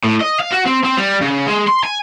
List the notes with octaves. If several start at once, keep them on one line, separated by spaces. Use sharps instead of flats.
A2
D#5
F5
F#4
C4
C4
G3
C#3
G#3
C6
G#5